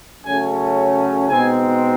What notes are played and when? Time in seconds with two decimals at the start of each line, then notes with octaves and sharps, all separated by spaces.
0.23 C#3 F#3 A3 C#4 G#5
1.29 B2 G#3 C4 D#4 G#5